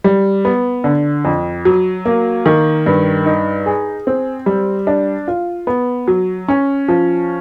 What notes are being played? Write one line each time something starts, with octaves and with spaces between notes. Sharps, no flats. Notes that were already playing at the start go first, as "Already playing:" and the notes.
G3
B3
D3
F2
F#3
A#3
D#3
G2
D#4
G#4
C4
G3
D4
F4
B3
F#3
C#4
F3